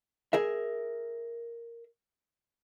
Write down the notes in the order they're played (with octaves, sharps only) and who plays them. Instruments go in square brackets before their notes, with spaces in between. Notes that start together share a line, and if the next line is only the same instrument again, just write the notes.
[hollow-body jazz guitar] G#4 A#4 E5